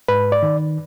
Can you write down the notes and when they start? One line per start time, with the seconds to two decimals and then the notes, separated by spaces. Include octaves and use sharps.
0.08 G#2 B4
0.32 D5
0.43 D#3